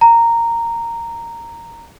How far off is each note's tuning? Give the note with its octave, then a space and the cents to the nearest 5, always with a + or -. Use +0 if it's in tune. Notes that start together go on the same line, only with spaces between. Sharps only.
A#5 -10